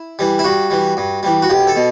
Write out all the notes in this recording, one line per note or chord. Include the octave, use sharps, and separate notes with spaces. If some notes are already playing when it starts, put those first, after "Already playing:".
Already playing: E4
E3 G3
E4
G2 F#4
E3 G3
G2
E3 G3
F#4
B1 G4
A4
B2